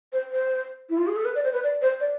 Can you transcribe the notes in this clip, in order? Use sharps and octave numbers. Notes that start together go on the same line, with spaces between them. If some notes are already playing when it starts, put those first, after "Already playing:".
C5
C5
E4
F4
G#4
A4
B4
D5
C5
B4
D5
C5
D5